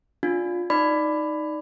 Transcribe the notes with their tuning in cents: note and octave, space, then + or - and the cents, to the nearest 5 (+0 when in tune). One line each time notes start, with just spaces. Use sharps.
D4 -5 F4 +20
D#4 +0 D5 +0 B5 +15